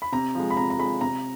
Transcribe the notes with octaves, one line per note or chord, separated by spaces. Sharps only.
B5
C3 A#5
F3 G#3
B5
C3 A#5
A#5
F3 G#3 B5
C3 A#5